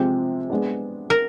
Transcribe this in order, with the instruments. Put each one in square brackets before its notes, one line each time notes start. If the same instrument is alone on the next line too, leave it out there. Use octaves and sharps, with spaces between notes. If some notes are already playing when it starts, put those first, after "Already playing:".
Already playing: [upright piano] C3 F3 G#3 C4 [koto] G4
[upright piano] G#3 B3 D4
[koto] A#4